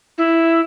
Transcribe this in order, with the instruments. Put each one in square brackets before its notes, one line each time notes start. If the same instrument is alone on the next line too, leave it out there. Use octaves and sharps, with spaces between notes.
[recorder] E4